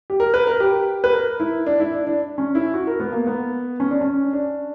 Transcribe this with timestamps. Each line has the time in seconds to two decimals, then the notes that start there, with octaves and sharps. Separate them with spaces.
0.10 G4
0.20 A#4
0.34 B4
0.47 A#4
0.60 G4
1.04 B4
1.13 A#4
1.40 E4
1.66 D4
1.80 E4
1.93 D4
2.07 D4
2.38 C#4
2.55 E4
2.74 F#4
2.87 A#4
3.00 B3
3.13 A#3
3.27 B3
3.80 C#4
3.91 D4
4.01 C#4
4.33 D4